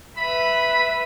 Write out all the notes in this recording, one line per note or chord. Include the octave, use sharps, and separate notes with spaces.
B4 E5 B5